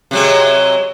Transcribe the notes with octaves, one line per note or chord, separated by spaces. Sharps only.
C3 F#3 G#3